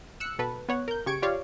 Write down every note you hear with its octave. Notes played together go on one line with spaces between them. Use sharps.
E6 F#6 C#7
B2 A4 B4
B3 C#5 F#5
A#4 G6
C#3 G4 C#6 G#6 D7
F4 G4 C#5 D5 F5